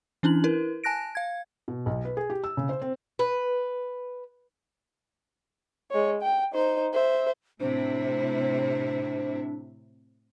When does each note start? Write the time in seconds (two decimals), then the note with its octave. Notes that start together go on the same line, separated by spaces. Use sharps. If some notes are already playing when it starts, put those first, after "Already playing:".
0.23 E3 C#4 D4 E4 F#7
0.44 E4 A#4 B4
0.84 G#5 A5 F#6 A#6 D7
1.15 F5 G#6
1.68 B2
1.86 B1
2.05 B4
2.17 G#4
2.30 G4
2.44 E6
2.57 C#3
2.69 C5
2.82 C4
3.19 B4
5.91 G#3 C#5
6.22 G5
6.53 D#4 C5
6.94 C5 E5
7.60 A2 C3 D4 E4 C5